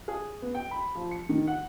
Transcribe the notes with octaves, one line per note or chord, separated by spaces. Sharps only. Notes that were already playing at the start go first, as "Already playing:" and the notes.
G#4
B3
G5
B5
F3
C#7
D#3
F#5